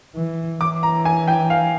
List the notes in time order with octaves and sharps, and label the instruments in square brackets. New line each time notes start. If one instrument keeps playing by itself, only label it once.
[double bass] E3
[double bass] E3 [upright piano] D6
[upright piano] A#5
G#5
G5
F5